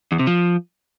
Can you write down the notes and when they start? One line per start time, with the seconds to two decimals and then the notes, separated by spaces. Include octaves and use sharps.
0.12 E2
0.19 C3
0.27 F3